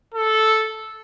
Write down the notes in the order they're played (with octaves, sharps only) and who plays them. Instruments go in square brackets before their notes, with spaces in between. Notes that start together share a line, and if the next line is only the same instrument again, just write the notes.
[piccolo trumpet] A4